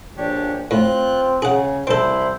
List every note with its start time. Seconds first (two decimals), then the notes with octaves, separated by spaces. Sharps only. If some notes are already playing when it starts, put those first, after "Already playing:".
0.17 A#1 D4 G4 C#5
0.71 A2 C4 F4 F#6
1.42 C#3 G#4 C#5 F#5
1.87 C2 C4 E4 A4 C5